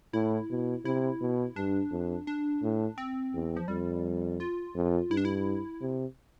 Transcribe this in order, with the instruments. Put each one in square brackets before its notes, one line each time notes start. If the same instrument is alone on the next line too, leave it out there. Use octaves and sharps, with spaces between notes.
[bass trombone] A2 [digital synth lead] E4
[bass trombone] B2
[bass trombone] C3 [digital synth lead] E4
[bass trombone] B2
[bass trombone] G2 [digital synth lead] D4
[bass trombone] F2
[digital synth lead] D4
[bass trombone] A2
[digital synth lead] C4
[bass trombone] E2
[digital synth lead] F3
[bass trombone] F2 [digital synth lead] G3
[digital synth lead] F4
[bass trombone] F2
[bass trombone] G2 [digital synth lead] E4
[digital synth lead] D4
E4
[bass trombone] C3